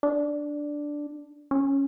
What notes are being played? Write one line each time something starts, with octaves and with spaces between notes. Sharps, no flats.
D4
C#4